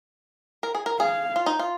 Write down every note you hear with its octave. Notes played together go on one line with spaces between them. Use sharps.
A#4
G#4
A#4
G#4 F5
F4
D#4
F4